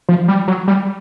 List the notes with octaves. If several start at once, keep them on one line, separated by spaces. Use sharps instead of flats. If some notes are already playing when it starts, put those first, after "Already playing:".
F3
G3
F#3
G3